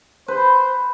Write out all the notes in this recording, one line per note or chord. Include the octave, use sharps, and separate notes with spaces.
B4 C5